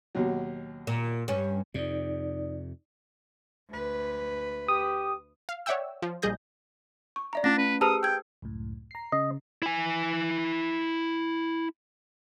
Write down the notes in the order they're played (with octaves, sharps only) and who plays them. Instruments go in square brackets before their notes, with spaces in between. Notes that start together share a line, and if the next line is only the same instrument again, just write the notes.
[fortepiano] D#2 B2 F#3
[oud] A#2
G2 C#4
[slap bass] F2 C3 [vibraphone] D#4 D5
[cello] D2 B4
[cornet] G4 [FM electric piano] D#6
[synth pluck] F5
C#5 D5 E5 F#5 G5 E6
F3
A#1 G3 G#4 D#5 G6 A#6
[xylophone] C#6
D5 E5 A#5
[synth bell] A3 C#4 [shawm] D4 [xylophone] A#6
[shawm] B4
[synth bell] G4 G#4 [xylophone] A5 A#5 F6 [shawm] D#6
[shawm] G5 [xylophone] E6 G#6
[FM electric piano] C#2 F#2 A2
A#5 C7
[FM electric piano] C#3 [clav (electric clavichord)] D#5
[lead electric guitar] E4 G#5